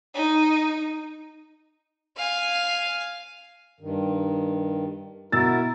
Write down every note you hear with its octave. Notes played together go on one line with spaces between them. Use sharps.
D#4
F5 G#5
G2 D#3
B2 E4 F#4 A#4 E6 A6